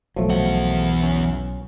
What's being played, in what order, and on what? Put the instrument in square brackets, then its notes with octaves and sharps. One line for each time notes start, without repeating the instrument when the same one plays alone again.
[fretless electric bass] B1 F#3 [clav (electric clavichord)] F3 A3
[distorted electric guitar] E2 F#5
[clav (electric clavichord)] C#4